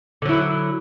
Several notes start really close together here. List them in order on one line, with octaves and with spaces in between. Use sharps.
D3 F#3 E4